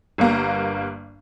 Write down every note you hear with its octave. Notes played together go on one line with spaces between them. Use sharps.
G1 G2 A#3 A#5